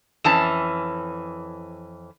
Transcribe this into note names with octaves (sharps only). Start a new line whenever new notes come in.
F2 E3 C#4 A5